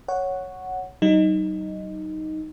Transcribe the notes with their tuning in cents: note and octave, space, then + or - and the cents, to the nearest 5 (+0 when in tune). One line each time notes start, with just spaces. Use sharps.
C#5 +0 F#5 +0
F#3 +45 D#4 +0